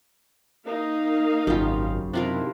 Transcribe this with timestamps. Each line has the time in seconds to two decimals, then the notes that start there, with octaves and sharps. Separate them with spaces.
0.65 A#3 D#4 F5
1.47 G#1 F#2 A#2 C#3 F4 G4
2.13 C3 D#3 D4 E4 F4 A#4